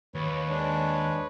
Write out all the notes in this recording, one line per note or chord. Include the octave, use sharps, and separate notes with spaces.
D#2 B4 C#5
G#3 D4